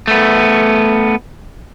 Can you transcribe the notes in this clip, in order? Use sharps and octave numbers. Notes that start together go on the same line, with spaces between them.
A3 B3